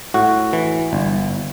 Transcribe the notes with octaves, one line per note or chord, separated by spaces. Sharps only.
A2 F#4
E3
G1